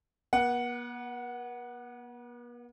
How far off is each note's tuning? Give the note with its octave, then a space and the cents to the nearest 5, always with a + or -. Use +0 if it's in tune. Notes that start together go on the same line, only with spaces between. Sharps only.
B3 -45 F#5 +0